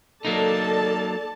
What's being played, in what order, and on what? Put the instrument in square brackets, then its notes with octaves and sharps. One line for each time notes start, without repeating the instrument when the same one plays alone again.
[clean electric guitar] F#3 A#3 D#4 [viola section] A4 D5 A5